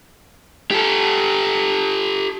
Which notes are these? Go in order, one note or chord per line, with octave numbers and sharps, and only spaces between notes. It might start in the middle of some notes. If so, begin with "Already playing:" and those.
G4 A4